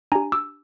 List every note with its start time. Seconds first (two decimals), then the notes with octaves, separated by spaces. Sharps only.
0.12 D4 G4 G#5 A#5
0.32 D6 E6